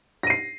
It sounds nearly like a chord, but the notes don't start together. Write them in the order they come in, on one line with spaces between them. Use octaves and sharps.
A#6 D#7 C7